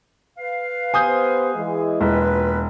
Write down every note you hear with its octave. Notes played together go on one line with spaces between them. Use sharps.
B4 F5
B3 G4 C5 G#5 D#6 G6
E3 G#3
E1 A#3 F4 B4